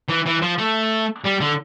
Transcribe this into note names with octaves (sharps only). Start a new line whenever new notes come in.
E3
E3
F3
A3
G3
D3